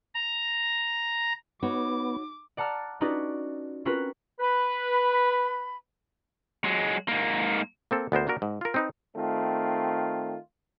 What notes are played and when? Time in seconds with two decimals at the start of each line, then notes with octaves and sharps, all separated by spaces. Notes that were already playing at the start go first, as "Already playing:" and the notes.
0.15 A#5
1.63 B3 D#4 F#4 C#5 D6
2.57 D5 F#5 A5 A#5 F6
3.01 C#4 D#4 F4 F#4 B4 D5
3.85 C4 C#4 F4 F#4 A#4 B4
4.40 B4 B5
6.64 F#3 G#3
7.08 G#2 A#3
7.91 A#3 C4 A4
8.12 D2 B3 A#4 C5
8.27 A#3 D4 F#4 A#4
8.42 G#2
8.61 F4 A#4
8.74 C4 D#4 B4
9.15 D#3 A3 C4 F4